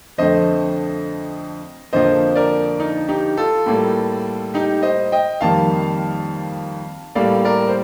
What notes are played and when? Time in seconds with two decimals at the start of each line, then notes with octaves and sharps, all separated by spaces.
0.18 F2 D3 A3 C5 D#5
1.93 F2 D3 F3 A#3 C5 D#5
2.36 A#4 D5
2.80 D#4
3.09 D#4 G4
3.38 F4 A4
3.66 A2 G3 A#3
4.54 D#4 G4
4.83 C5 D#5
5.12 D#5 G5
5.41 F2 D#3 G3 A#3 F5 A5
7.15 A2 G3 A#3 D5 F5
7.45 A#4 D5
7.68 C5